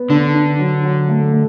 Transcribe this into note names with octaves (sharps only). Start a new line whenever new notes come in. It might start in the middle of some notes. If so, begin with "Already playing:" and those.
Already playing: B3
D3 D4
D4
F#3
F#3
A3
A3